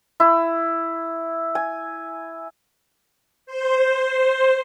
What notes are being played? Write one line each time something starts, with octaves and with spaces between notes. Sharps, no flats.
E4
G#5
C5